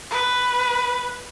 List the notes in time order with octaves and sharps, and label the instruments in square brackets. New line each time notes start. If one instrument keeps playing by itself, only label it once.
[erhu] B4